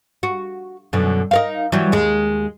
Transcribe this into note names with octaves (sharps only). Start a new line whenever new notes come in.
F#4
F#2 B2 D3
D#4 A#4 F5
E3 F#3 G3
D#2 G#3